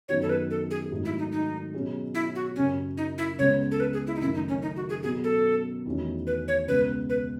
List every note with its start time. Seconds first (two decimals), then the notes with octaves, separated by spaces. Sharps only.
0.09 F#2 D#3 F#3 B3 C#5
0.22 A4
0.29 B4
0.51 A4
0.71 G#4
0.92 G#1 G#2 D#3 F#3 A3
1.05 E4
1.19 D#4
1.32 D#4
1.73 B2 F#3 C#4 G#4
2.15 E4
2.35 F#4
2.56 F#2 C#3 F#3 C#4
2.97 D#4
3.18 E4
3.39 C#2 C#3 G#3 B3 C#5
3.71 A4
3.80 B4
3.93 G#4
4.07 E4
4.16 D#4
4.21 F#1 F#2 D#3 A3 E4
4.35 D#4
4.49 C#4
4.62 D#4
4.76 F#4
4.89 G#4
5.03 B2 F#3 B3 G#4
5.24 A4
5.86 E2 D#3 A3 C#4 F#4
6.27 B4
6.48 C#5
6.68 C#2 B2 G#3 B3 B4
7.10 B4